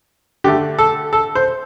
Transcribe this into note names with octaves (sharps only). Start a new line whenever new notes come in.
D3 A3 G4
A4
A4
C5